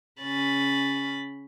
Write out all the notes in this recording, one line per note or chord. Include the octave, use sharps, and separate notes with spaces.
C#3 C#4 B5 A6